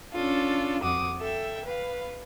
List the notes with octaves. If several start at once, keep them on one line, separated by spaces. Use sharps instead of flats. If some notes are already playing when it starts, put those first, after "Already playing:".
C#4 D4 F4 A4
F2 F#4 D6 D#6
A4 E5 G5
B4 F5